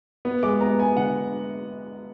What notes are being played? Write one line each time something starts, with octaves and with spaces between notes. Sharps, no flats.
B3
G#3 D6
B3 A#5
B3 G#5
D3 F#5